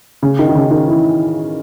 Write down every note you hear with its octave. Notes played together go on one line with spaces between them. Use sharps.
C#3
D#3
D#3
C#3
D#3
E3